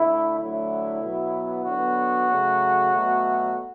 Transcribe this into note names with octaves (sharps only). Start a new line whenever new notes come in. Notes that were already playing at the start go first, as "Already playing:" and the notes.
Already playing: D3 A3 E4
D3 F#3 A3 E4
B2 F#3 B3
D3 F#3 B3 F#4
C#3 F#3 A3
B2 F#3 A3